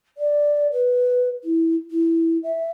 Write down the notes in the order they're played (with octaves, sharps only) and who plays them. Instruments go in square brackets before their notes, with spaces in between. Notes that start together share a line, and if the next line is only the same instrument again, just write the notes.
[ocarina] D5
B4
E4
E4
E5